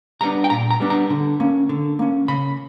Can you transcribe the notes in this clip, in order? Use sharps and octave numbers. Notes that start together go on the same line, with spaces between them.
G3 B3 D4 A#5
G5
A#2 A#5
A#5
G3 B3 D4
A#5
D3
A#3 C#4
D3
A#3 C#4
C#3 B5